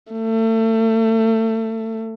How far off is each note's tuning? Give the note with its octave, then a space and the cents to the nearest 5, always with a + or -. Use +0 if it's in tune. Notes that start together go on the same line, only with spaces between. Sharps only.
A3 +30